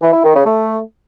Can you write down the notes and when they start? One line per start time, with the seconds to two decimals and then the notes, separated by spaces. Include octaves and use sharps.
0.02 E3
0.13 E4
0.24 D#3
0.35 C#3
0.46 A3